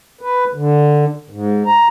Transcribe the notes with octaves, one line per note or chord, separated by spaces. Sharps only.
B4
D3
G#2
A#5